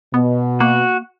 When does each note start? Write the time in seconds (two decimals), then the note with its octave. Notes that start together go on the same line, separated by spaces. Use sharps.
0.14 B2 B3
0.60 A#3 F#4